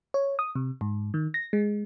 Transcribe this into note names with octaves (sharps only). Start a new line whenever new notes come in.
C#5
D#6
C3
G#2
D#3
A#6
G#3